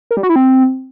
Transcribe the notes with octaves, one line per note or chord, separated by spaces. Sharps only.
A#4
G3
F#4
E4
C4